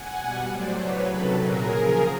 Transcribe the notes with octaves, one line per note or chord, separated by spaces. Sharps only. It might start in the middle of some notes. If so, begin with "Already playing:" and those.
Already playing: F#5 G#5
B2 G3
A2 F#3 C5 D5
C#3 F#3 B4 C#5
C3 D#3 F#3 A4 B4
A#2 F#3 G#4 A#4
C#3 F3